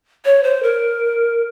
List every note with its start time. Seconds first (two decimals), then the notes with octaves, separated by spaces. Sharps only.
0.25 C#5
0.44 C5
0.63 A#4